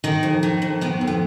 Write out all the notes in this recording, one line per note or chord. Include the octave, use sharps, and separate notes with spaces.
D#3 D#4
F2
D#3
F2
D#3 B3
F2
B3